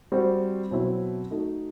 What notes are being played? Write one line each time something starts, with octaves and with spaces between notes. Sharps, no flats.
G3 C4 F#4 C5
B2 F#3 C4 E4
A3 D#4 F#4